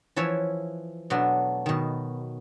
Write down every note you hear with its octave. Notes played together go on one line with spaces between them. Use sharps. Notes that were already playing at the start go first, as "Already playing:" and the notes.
E3 F3 C#5 E5
B2 F#3 A3 B3 D4
B2 D#3